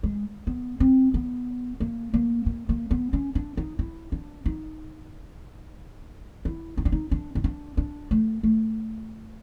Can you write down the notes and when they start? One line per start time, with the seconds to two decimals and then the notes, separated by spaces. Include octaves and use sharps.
0.03 G#3
0.47 B3
0.80 C4
1.14 B3
1.80 A#3
2.14 A#3
2.46 A#3
2.69 A#3
2.91 B3
3.13 C#4
3.35 D4
3.57 D#4
3.79 E4
4.12 D4
4.46 D#4
6.45 E4
6.77 D#4
6.85 D4
6.92 D#4
7.11 D4
7.35 D#4
7.44 D4
7.77 D4
8.11 A3
8.43 A3